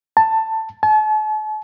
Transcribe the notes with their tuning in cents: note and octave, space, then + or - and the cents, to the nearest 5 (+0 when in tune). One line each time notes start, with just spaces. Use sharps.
A5 +15
A5 -40